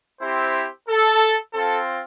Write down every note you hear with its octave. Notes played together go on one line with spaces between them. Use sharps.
C4 E4 G4 C5
A4
C4 F4 A4